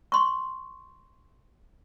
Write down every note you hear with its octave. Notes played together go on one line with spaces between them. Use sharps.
C6 C#6